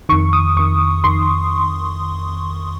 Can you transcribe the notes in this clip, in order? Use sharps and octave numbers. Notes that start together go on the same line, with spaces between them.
F2 D#3 C#6
D#6
F2 D#3 C#6
F2 D#3 C6